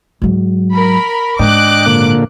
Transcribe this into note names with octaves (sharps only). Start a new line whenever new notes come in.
G#2 F#3
A#4 B5
G#2 D#3 D4 D#5 G5 D6 F#6
A#2 D3 A#3